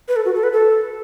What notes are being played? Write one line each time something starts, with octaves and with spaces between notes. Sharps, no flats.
B4
A4
F#4
A4
B4
A4